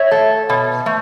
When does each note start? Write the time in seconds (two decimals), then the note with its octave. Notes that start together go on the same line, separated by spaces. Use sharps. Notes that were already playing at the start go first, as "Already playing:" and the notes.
Already playing: C#5 E5
0.11 A3
0.50 B2
0.86 A3